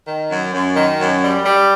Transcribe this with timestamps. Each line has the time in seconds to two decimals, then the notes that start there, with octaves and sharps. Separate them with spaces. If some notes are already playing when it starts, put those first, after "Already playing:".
0.07 D#3
0.30 F#2
0.54 F#2
0.76 D#3
1.00 F#2
1.23 G3
1.45 G3